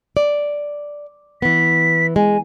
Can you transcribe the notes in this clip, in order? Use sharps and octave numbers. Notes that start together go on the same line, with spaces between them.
D5
E3 B3 B6
G#3 G#5